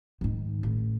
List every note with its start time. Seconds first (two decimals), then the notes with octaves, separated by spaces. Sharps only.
0.21 G#2 D#3
0.63 A1